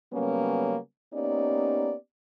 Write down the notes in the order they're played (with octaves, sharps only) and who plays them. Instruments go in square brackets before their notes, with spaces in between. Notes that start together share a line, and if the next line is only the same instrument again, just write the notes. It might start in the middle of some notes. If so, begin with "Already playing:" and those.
[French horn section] C#3 F#3 G3 A#3 B3 C#4
A#3 B3 C#4 D#4 G4 D5